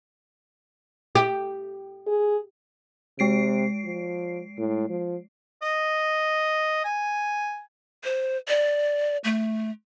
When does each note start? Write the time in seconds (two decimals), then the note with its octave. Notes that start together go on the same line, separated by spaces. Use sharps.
1.15 G4
2.07 G#4
3.19 C3 G#3 C7 D7
3.85 F3
4.59 A2
4.89 F3
5.62 D#5
6.84 G#5
8.04 C5
8.48 D5
9.24 A3